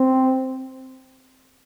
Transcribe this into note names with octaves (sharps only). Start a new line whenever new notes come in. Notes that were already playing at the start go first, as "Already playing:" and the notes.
Already playing: C4